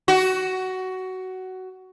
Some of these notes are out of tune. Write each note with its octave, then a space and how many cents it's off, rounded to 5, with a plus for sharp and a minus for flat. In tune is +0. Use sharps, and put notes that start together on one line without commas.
F#4 +15